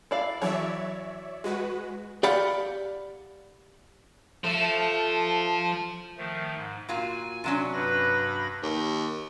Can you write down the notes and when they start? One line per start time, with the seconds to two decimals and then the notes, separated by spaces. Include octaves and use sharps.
0.11 E4 D5 F5
0.42 E3 F#3 C#5 D5 E5
1.44 G#3 F#4 B4
2.23 G4 D5 F5 F#5 B5
4.44 F3 A3
6.18 D#3 F3 A3
6.56 G#2
6.89 A#2 F4 F#4 G#5
7.44 C3 F#3 C#4 D4
7.73 G2 B4 B5 A#6
8.63 D#2